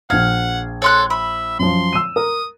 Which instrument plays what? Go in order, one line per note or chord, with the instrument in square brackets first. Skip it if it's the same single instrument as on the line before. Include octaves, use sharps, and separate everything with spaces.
[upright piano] A#1 G#6 [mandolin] F5 [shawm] F#5
[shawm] A4 [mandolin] C#5 C6 F#6
[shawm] E5 [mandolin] B5
[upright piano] F#2 F3 [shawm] C6
[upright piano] E6 D#7
[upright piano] A#4 [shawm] D#6